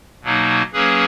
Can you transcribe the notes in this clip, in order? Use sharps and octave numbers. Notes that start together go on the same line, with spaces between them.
B2 F#3 A#3 D#4
F#3 A#3 C#4 G#4 B4